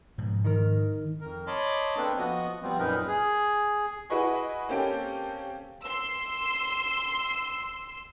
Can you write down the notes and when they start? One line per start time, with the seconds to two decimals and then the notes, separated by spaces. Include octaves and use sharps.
0.18 G#2 B2 F3
0.44 D#3 A#4
1.21 F2 A#4
1.47 C#5 D#5 A5 B5 C6 D6
1.97 A#3 C4 D4 A4 B4
2.18 F3 B3 F#4 D#5
2.63 F3 G3 B3 C4
2.79 F#2 A#2 D#4 A#4 B4
3.08 G#4
4.10 E4 F#4 G#4 B4 D#5 C#6
4.69 A#3 C4 C#4 G4 A4 G5
5.81 C6 E6